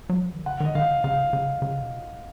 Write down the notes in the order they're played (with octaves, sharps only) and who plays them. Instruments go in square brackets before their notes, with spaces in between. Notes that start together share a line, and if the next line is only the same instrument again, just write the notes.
[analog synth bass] F#3
F3
D#3
[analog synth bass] C#3 [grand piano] F#5
[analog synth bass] D#3 [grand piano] D#5
[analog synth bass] D#3 [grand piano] F5
[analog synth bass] C#3
[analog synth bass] C#3 [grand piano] F5
[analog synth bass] C#3
C#3
B2